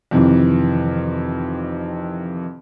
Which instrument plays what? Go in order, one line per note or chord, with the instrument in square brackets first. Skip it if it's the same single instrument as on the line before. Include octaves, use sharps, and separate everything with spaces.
[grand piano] F2 C3 D#3 E3